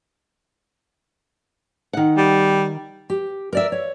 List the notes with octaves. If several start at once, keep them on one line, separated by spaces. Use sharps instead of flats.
D#3 F#5
G3
G4
A#4 D5 E5
C#5